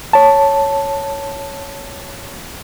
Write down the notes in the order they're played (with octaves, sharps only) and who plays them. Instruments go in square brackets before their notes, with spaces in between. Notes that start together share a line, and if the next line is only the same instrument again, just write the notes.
[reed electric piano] C#5 A5